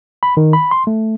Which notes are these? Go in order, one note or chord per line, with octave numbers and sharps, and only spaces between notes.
B5
D#3
B5
C6
A3